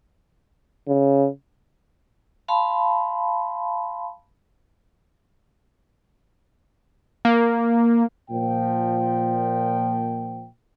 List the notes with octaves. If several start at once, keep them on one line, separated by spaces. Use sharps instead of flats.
C#3
F5 A5 B5 C6
A#3
A#2 F3 G5